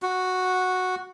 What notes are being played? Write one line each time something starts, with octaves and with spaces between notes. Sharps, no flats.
F#4